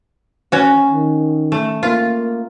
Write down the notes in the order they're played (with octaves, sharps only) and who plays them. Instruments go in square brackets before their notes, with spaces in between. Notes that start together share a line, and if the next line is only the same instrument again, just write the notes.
[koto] C#4 F#4
[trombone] D#3
[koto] A3
[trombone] A#3 [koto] F4